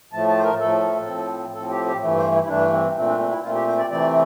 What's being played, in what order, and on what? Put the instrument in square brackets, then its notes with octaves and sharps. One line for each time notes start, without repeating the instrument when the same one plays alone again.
[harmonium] A2 F3 A3 A5
A5
C5
A#4
A2 F3 A3 A4
A2 F3 C4
A2 F3 C4 A4
G4
G4
G2 E3 A3
C5
E4
E4
G2 E3 A3 D4
C4
A#2 A3 C4
D4
C4
E4
A#2 A3 C4 F4
G4
C5
D5
C3 E3 A3 C4 D5